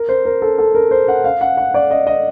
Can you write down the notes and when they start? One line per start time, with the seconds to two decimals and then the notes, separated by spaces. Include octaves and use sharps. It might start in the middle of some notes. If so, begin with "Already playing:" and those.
Already playing: A#4
0.09 C5
0.25 A#4
0.42 A4
0.58 A4
0.75 A#4
0.91 C5
1.08 F#5
1.24 F5
1.41 F#5
1.57 F#5
1.74 D5
1.91 D#5
2.07 D#5